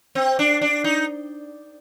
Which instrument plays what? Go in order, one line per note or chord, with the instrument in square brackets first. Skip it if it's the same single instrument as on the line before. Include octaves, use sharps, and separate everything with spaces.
[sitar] C4
D4
D4
D#4